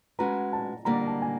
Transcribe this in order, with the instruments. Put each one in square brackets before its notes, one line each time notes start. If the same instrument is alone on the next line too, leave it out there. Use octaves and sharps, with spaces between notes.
[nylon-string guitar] G#3 C#4 F#4 B4 [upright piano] A#5
[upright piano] A5
[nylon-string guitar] D3 G3 A#3 [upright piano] A#5
[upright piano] A5
G#5